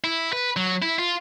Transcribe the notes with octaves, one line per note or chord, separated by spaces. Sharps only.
E4
B4
F#3
E4
F4